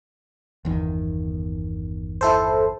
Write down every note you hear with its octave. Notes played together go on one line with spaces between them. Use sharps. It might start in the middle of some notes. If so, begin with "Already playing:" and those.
G1 E2 D#3
E4 A4 C5